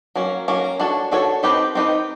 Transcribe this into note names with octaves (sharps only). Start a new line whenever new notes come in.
F#3 A#3 C#4
F#3 A#3 C#4
D4 F#4 A4 C#5
D4 F#4 A4 C#5
C4 D#4 G4 B4
C4 D#4 G4 B4